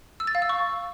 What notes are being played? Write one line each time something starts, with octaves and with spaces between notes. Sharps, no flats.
E6
A6
F5
E6
C#6